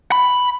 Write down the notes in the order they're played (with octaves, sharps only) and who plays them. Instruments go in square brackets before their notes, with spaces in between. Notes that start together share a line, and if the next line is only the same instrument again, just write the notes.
[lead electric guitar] B5